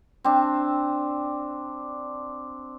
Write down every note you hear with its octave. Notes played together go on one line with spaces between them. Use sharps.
C4 D4